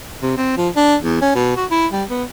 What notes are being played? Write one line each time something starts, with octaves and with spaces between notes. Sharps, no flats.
C3
C4
F3
D4
E2
C#4
B2
F#4
E4
G3
B3